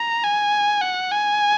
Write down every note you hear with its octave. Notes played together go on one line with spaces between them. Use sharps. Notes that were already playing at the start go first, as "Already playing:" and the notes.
Already playing: A#5
G#5
F#5
G#5